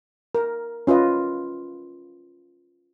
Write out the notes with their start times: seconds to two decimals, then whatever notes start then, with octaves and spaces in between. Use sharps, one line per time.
0.35 A#4
0.87 C#4 F4 B4 D#5